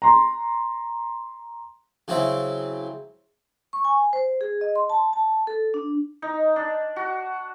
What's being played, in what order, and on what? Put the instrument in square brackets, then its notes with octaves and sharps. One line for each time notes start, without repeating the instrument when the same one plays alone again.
[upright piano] A#5 C6
[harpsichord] C#3 F#3 C4 E4
[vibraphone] C#6
G#5
C5
G#4
D#5
C6
A5
A5
A4
D4
[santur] D#4
D4
F#4